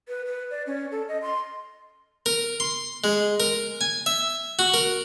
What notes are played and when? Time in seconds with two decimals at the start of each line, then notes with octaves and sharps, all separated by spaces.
0.08 B4
0.26 B4
0.51 D5
0.67 C#4
0.92 A4
1.08 D#5
1.22 C6
2.26 A#4
2.60 C6
3.04 G#3
3.40 A#4
3.81 G#5
4.06 E5
4.59 F#4
4.74 A#4